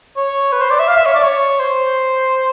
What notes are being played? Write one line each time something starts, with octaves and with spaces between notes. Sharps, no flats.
C#5
B4
C5
D5
E5
F5
E5
C#5
D5
C#5
C5